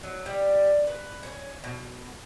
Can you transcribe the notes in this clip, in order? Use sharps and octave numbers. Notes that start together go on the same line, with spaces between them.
F#3
G3
B4
C#4
B2